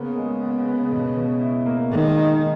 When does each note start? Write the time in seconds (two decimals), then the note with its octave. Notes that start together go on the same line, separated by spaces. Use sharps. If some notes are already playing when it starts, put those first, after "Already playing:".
Already playing: C#3 A#3 B3
0.17 G#3
0.42 B3
0.67 B3
0.92 B2
1.16 B2
1.41 E4
1.66 A#3
1.91 D#3 G#3
2.16 D#4